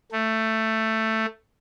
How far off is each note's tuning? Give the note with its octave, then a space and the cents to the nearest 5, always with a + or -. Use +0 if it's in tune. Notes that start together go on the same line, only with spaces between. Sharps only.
A3 +10